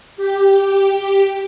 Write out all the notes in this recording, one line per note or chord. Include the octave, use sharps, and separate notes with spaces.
G4